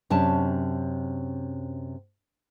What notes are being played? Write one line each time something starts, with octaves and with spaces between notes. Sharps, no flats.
F#2 C3 C#4 D4 A5